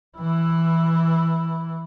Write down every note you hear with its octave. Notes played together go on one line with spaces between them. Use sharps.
E3 E4